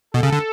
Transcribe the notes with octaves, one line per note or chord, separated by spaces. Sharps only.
B2 A4
C#3
D3